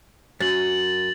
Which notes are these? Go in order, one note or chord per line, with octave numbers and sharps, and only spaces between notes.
F#2 A6 F#7